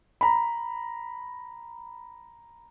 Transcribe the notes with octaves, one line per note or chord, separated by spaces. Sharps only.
A#5 B5